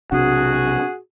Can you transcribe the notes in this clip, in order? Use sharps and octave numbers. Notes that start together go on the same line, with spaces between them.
B1 C3 D4 F#4 G#4